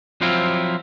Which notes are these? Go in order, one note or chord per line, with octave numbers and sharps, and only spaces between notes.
F3 F#3 C4 E4 F4